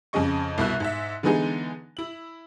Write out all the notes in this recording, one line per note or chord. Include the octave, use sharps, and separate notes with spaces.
F2 C#3 G#4 D#5 C#6
C2 B2 E4 E5 F#6
G#2 E5
D3 E3 G#3 B3 D#4 G#4
E4 F#7